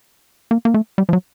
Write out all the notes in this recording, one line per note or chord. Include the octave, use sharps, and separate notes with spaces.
A#3
A#3
A3
G3
F3
F#3